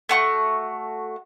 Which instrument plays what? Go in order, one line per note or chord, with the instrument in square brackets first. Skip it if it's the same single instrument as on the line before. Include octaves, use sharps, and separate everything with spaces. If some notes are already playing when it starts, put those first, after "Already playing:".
[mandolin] A3 F#4 C#6